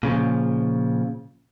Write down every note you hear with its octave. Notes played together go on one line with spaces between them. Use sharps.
A#2 C#3 F3